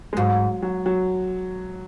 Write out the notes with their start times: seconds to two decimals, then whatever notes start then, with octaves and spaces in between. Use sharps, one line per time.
0.13 G#3
0.17 G#2 F#3
0.63 F#3
0.86 F#3